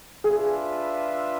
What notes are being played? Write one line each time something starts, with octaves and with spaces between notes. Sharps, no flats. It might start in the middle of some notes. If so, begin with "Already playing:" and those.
D4 F4 G#4 B4 E5